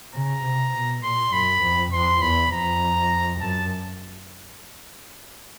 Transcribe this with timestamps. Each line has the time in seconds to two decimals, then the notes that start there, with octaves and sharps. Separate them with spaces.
0.14 C#3 A#5
0.44 C3
0.74 B2
1.03 A#2 C6
1.33 F#2 B5
1.62 F2
1.92 F2 C6
2.22 E2 B5
2.51 F2 A#5
3.41 F#2 A5